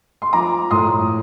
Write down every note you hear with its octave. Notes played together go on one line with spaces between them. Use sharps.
C6
F3 A#5 D6
A2 C6 D#6